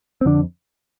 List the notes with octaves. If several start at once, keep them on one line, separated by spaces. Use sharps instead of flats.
C4
F2 D3 D4